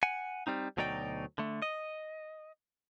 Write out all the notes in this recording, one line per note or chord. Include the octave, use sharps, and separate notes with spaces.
F#5 G#5
G3 C4 D#4
D2 B2 F#3 D#4 D5 G5
D3 A3
D#5